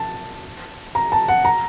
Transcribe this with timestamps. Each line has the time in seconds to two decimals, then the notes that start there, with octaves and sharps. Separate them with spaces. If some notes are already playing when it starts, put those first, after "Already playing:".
Already playing: A5
0.95 A#5
1.12 A5
1.28 F#5
1.45 A#5